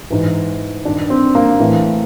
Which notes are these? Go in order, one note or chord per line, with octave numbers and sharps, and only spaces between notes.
G#2 E3
G2 D#3 D4
C4
A#3
A2 E3